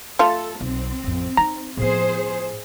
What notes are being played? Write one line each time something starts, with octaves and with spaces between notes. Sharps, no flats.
A3 F4 A4
B1 C4
A1 F2
D#4 A#5
A2 F3 B3 G#4 C5